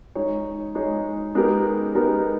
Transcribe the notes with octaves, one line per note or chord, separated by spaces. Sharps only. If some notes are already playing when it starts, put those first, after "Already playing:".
G#3 D#4 G#4 C#5
G#3 D#4 G#4 C#5
G#3 B3 D#4 G4 A#4
G#3 B3 D#4 G4 A#4